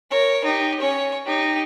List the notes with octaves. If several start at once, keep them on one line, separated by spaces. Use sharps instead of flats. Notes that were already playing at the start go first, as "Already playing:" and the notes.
A#4 C#5
D#4 G4
C#4 C#5
D#4 G4